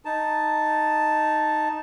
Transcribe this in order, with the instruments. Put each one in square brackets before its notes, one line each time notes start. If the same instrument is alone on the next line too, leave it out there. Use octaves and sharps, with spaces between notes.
[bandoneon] D#4 A5